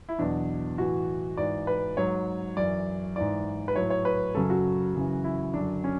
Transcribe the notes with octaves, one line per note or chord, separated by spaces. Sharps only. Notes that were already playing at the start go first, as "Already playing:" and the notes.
E4
E2 B2 F#3 D4
A2 E3 F#4
G#2 E3 D5
B4
G#2 F#3 C#5
F#2 E3 D5
G#2 E3 D5
B4
A2 F#3 C#5
C#5
B4
F#2 C#3 F#3 A4
F#4
F#2 C#3 E3
E4
F#2 D3 F#3 D4
C#4